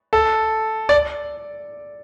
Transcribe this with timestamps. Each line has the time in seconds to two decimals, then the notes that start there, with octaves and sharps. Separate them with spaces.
0.13 A4
0.89 D5